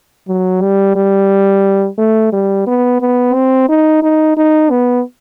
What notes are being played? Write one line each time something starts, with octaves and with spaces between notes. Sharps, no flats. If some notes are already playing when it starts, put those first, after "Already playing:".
F#3
G3
G3
A3
G3
B3
B3
C4
D#4
D#4
D#4
B3